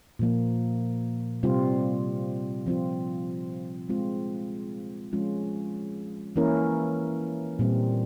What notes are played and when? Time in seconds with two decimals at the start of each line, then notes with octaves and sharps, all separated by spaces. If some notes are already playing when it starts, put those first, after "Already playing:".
0.19 A#2 F3 A#3
1.43 C3 G3 C4 F4
2.66 F3 C4 F4
3.89 G#3 C4 F4
5.12 F3 G#3 C#4 F4
6.36 E3 A#3 C#4 E4 A#4
7.59 A#2 G3 C4